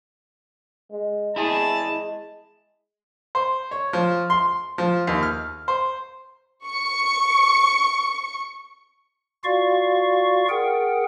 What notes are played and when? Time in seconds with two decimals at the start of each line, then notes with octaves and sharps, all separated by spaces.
0.91 G#3
1.36 G#3 E4 G#4 A5
3.35 C5
3.71 C#5
3.93 F3
4.30 C6
4.78 F3
5.07 D#2
5.23 F6
5.68 C5
6.65 C#6 C#7
9.44 F4 F#4 D5 F5 C#6
10.49 G#4 A#4 F#5 G5